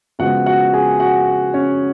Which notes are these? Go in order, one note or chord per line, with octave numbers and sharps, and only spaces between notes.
C#3 F3 G#3 B3 F#4 F#5
F#4 F#5
G#4 G#5
F#4 F#5
C#4 C#5